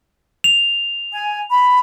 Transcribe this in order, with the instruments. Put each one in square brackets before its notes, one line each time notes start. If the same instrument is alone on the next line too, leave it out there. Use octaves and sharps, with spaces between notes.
[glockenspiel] F7
[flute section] G#5
B5